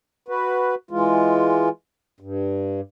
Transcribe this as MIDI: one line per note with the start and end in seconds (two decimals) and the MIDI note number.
0.28 0.75 66
0.28 0.75 71
0.91 1.69 52
0.91 1.69 56
0.91 1.69 65
2.20 2.81 43